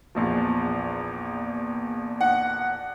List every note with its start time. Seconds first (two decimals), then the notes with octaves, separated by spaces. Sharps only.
0.15 A#1 E2 F3
2.21 F#5